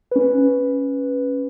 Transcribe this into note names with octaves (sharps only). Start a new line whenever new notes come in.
C#4 B4